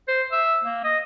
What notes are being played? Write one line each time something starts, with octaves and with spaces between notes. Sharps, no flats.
C5
E5
A#3
D#5